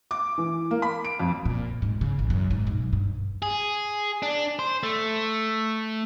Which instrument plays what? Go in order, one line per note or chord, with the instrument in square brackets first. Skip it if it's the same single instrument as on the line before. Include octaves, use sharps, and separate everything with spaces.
[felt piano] D6
E3
A#3
B5
D7
F2
[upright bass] A#2
G#2
C#3
A1
F#2
G#2
B1
G2
[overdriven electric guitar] G#4
D4
C5
A3